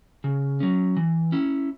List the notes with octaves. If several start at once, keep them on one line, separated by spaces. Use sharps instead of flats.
C#3
F#3 C#4
E3
C#4 E4